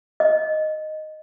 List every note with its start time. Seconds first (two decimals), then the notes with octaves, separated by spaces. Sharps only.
0.20 D#5